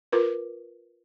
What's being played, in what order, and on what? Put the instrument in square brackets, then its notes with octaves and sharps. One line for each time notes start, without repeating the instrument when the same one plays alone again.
[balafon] F4 A#4 B4